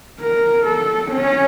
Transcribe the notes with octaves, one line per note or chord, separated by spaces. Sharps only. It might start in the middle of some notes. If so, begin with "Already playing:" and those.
A#4
A4
C#4